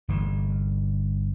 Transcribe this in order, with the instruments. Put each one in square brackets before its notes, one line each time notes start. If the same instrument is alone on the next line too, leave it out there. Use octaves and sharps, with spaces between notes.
[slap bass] G1 E3